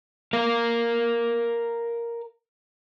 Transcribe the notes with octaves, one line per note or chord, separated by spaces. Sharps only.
A#4 F5